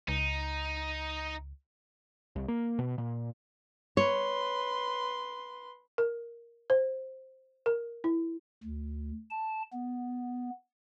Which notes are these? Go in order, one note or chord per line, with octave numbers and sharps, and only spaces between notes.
C#2 D#4
C2
A#3
B2
A#2
B4 C#5 C6
A#4
C5
A#4
E4
D2
A5
B3